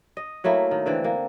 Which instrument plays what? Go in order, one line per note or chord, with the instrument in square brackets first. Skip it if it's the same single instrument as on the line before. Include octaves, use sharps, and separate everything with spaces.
[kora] D#5
F#3 A3 A#3 E4
D#3
D3 E3 C4
A#3